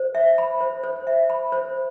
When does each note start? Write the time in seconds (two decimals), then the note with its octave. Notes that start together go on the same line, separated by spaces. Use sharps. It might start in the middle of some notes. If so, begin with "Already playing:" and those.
Already playing: C5
0.15 E5
0.38 B5
0.61 C5
0.84 C5
1.07 E5
1.30 B5
1.52 C5